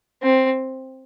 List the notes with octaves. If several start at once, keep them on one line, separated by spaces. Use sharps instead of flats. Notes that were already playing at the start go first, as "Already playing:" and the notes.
C4